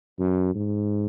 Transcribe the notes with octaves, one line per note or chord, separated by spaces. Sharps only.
F#2
G#2